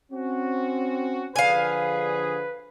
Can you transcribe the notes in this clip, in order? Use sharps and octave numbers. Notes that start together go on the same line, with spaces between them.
C4 C#4 F#4
D3 F3 G#4 B4 F5 G#5